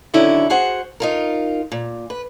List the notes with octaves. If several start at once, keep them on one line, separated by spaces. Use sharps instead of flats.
D3 D#3 F#3 C#4 D4 E4
F#4 G#4 C5 F#5
D#4 F4 A#4
A#2
B4